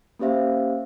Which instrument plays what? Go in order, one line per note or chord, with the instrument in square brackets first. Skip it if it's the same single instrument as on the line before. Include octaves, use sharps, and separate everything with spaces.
[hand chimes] A#3 C#4 G4 C5 E5 F5